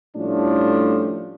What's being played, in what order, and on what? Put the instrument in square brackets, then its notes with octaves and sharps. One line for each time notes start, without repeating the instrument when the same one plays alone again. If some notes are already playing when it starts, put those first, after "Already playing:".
[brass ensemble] A2 F3 G3 A3 C#4 D4